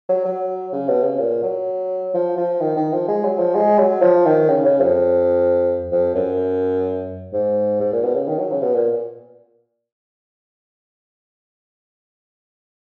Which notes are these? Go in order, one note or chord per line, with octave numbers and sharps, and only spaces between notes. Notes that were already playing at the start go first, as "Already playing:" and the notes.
F#3
F#3
C#3
B2
C#3
A#2
F#3
F3
F3
D#3
D#3
F3
G#3
F#3
F3
G#3
F#3
F3
D#3
C#3
C#3
F2
F2
F#2
G#2
G#2
A#2
B2
C#3
D#3
F#3
C#3
B2
A#2